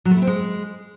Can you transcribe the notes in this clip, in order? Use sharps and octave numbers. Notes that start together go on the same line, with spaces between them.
F#3
A3
E4
C4
G#3